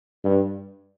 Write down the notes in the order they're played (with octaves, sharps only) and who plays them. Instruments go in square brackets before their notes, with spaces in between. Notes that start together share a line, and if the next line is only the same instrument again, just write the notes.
[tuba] G2